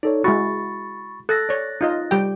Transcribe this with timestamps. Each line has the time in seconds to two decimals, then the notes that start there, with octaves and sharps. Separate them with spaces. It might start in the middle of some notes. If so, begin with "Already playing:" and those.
0.03 D#4 A4 C#5 D5
0.24 G#3 E4 F#4 B5 C#6 A6
1.29 A4 F#6 A6 A#6
1.49 C#5 D5
1.81 D#4 F4 D#5
2.11 G3 G4 G5